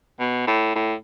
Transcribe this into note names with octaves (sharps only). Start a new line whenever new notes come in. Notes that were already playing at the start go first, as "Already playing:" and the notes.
B2
A2
A2